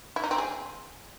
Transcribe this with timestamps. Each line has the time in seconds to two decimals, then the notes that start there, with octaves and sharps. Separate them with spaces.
0.16 E4
0.24 D#4
0.31 C4
0.38 G#4